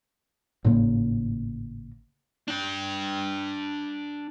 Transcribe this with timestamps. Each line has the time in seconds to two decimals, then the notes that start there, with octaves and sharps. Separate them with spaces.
0.65 G#1 A2 C#3 A#3
2.48 D4 G5